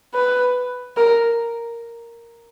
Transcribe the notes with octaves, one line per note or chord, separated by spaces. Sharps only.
B4
A#4